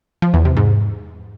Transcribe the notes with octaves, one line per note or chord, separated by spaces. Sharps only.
F3
E2
C3
G#2